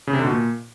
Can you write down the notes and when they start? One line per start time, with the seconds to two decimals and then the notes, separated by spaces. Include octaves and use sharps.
0.07 C#3
0.13 C3
0.19 D3
0.25 B2
0.30 A#2